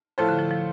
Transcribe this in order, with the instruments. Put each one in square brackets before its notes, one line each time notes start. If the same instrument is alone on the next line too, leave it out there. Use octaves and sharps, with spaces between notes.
[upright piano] A2 A3 F4 A4 C5 [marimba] F3
[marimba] D3
F3
F3